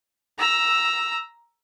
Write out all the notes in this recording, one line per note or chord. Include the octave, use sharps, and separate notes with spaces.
A#5 E6